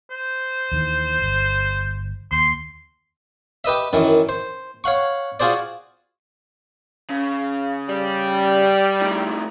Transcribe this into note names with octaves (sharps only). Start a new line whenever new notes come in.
C5
D#2 D#3 E3
G1
D#2 C6
G4 B4 D#5 E5
F#2 D#3 E3
C5
C#5 F5 F#5 C#6
F4 F#4 G#4 C5 D5
C#3
G3
A2 D#3